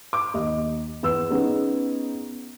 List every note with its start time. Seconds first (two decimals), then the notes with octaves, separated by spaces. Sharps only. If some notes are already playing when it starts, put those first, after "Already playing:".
0.13 D6
0.34 D#2 D#5
1.03 E2 B4 E6
1.30 B3 C#4 D#4 G#4